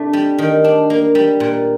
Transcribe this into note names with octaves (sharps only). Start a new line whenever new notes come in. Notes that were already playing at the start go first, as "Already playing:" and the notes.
Already playing: C3 A3 D4
G3
D#3
D4
A#3
G3
A#2